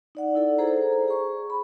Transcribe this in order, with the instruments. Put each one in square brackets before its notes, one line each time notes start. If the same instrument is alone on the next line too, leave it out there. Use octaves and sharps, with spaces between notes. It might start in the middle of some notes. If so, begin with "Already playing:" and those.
[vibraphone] D#4 D5 F#5
D#4 E4 A4 D5
G#4 A4 C5 A#5
G#4 C#6
B5